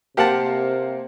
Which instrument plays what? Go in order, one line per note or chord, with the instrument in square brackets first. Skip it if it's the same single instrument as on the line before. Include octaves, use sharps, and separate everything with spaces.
[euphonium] C3 [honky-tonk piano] A#3 C5 F5 [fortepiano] G4 F#5 A5